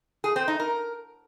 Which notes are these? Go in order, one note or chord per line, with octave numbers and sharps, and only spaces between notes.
G#4
C4
D#4
A#4